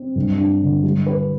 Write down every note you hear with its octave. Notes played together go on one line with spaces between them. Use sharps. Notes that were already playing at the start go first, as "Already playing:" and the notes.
Already playing: C4
G2
D4
D3
G3
B4